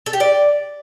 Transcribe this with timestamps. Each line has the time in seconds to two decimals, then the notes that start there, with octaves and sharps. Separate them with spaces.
0.06 A4
0.13 G4
0.20 D5